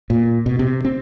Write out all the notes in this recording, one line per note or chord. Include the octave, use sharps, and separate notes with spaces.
A#2
B2
C3
C4